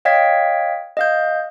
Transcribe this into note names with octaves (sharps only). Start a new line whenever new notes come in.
C#5 D#5 F5 G5 G#6 B6
D#5 F5 G6